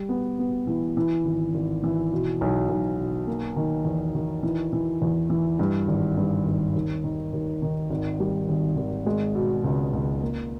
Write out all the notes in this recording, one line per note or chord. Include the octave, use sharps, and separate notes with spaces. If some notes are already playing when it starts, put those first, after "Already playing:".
Already playing: G3
B3
B3
E3
E3
G#1
G#1
E3
B2
B1
B1
B2
A#3
D#3
E2
D#3
E3
E3
E2
E3
G2
G#1
G2
G#1
D#2
D#3
D#2
D#3
G#1
G3
G#1
G#1
G#3
B2
C#2
C#2
A#3